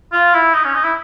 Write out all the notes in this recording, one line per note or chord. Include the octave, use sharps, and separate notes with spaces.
F4
E4
D#4
C#4
D#4
E4